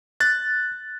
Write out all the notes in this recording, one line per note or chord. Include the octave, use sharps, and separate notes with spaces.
F#6 A6